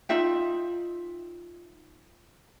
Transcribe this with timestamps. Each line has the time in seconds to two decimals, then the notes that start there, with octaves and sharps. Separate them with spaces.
0.09 D#4 F4 E5 G5